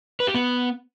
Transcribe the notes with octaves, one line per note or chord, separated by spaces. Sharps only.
B4
G4
B3